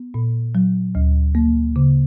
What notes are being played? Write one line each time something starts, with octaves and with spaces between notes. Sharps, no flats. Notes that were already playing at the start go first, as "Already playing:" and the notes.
Already playing: B3
A#2
F#3
D2
A#3
C#3